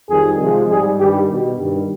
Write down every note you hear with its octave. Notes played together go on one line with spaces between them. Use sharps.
F2 D#3 G3 G#4
C3 F3 G#3
G#2 G3 G#4
G2 D#3 G3 G4
B2 G3
G2 D#3 G3